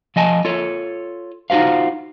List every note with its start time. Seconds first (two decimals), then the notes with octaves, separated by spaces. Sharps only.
0.16 F3 D#5 G#5 A5
0.45 F4 A4 C#5
1.50 D#4 F4 F#4 C5 F5